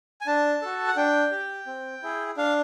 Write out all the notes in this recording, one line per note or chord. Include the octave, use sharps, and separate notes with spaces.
G#5
D4 A5
F#4 A4
F#5
D4 G5
G4
C4
E4 G#4
D4 F5